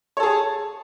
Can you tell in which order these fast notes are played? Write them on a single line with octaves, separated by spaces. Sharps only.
C#5 A4 G#4 A5